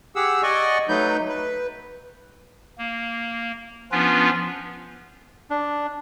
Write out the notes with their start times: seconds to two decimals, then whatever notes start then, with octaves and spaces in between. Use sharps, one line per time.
0.16 G4 G#4 F#5 E6
0.43 D5 D#5 F#5 G#5 C#6
0.89 F#3 A3 D#4 B4 G6
1.28 B4
2.78 A#3
3.92 F3 B3 C#4 D4 F4 B4
5.50 D4